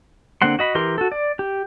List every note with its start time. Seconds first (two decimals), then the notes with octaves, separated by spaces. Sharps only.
0.42 D3 A#3 C4 F#5 C6
0.59 F#4 D#5 B5
0.75 E3 G4 A#4 C6
0.98 F#4 A4
1.12 D5
1.39 G4